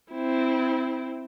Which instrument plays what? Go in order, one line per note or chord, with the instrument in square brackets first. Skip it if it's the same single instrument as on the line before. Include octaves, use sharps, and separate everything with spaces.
[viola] C4 E4